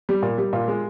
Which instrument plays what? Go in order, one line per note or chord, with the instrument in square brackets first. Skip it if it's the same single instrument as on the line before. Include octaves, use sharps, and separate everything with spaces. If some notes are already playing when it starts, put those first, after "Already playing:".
[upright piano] G3
A#2
G3
A#2 F4
G#3